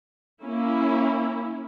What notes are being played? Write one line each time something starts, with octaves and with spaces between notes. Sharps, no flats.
A#3 C#4 E4